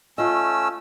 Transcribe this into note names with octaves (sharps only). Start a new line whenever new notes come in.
A3 C#4 F4 D#5 E6